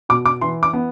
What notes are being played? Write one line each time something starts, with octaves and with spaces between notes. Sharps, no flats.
B2 D6
D6
E3 C6
D6
B3